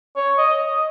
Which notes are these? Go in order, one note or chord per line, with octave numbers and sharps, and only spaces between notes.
C#5
D#5